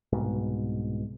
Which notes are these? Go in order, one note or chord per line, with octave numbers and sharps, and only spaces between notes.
C2 G#2 B2